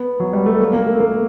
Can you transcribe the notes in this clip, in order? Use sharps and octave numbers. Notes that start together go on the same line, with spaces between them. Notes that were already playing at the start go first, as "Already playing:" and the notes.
Already playing: B3
F#3
G3
A3
A#3
A#3
A3
A#3